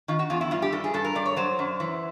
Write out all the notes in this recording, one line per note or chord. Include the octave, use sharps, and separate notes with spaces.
D#3 F4
F#4
E2 F4
E4
G2 F4
G4
G2 A4
G#4
G2 A4
A#4
G2 D5
C#5
F#3 C5
F#2
E3